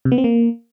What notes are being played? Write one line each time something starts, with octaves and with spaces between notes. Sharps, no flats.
C3
B3
C4
A#3